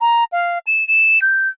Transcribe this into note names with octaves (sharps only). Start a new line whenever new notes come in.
A#5
F5
E7
E7
G6